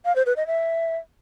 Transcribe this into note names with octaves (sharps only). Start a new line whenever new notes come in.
F5
C5
B4
D#5
E5